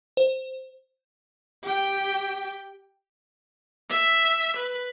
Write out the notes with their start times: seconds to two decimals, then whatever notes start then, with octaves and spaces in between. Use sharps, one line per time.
0.17 C5
1.63 G4 G5
3.90 E5
4.57 B4